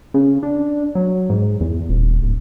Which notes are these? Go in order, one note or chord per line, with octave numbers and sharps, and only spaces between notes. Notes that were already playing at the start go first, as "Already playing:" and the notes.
C#3
D4
F#3
G#2
E2
D#1
D1